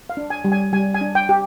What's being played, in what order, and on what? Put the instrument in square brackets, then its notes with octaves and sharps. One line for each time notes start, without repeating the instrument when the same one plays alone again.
[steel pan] F5
D4
G#5
G3
G#5
G3 G#5
G#5
D4
G5
G4